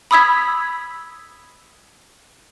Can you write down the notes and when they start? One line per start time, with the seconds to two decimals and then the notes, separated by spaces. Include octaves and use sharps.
0.11 B5 D#6 E6 G#6 B6